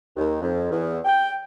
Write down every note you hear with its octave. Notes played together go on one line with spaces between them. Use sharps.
D#2
F2
E2
G5